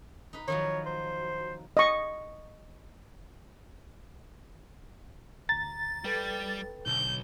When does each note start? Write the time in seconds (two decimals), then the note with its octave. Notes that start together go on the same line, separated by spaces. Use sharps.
0.33 D#4 B4
0.48 D#3 F3 F#3 C#5
0.86 C5
1.77 D#5 C#6
5.49 D2 A#5 A6
6.05 G3 A4 B4 G5
6.86 B1 D3 G6